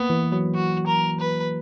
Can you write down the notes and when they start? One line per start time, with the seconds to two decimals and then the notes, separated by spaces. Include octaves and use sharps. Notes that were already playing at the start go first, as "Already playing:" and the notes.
Already playing: A#3 B3
0.10 E3
0.32 F#3
0.54 F#4
0.87 A#4
1.20 B4